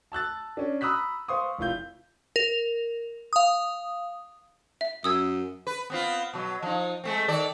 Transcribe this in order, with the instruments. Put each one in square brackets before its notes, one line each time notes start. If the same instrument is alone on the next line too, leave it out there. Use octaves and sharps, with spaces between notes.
[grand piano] A5 E6 F#6 A6
C#4 D4
A#5 B5 D#6 E6 F#6 B6
C5 F5 C6 C#6 D#6
F1 E4 F4 G6
[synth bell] A#4
F5 D#6
[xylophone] E5
[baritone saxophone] F#2 [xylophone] D#6 E6 G#6
[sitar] B4
B3 C4 F4
B2 F#3
F3 D#4
G#3 A3 C4
D#3 A4 D5